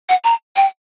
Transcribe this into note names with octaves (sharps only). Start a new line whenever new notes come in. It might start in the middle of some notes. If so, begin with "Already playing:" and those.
F#5
A#5
G5